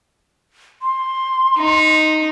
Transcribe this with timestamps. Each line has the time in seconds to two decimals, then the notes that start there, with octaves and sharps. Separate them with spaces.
0.82 C6
1.58 D#4